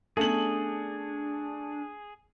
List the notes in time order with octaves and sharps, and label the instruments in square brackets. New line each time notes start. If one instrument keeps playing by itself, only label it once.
[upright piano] A3 F#7 [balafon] B3 C#4 [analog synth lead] D4 [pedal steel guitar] G#4